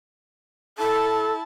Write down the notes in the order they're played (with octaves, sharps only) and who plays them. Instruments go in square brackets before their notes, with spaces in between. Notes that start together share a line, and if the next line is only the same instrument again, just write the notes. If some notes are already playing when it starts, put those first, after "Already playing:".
[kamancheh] E4 A5 [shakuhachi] A4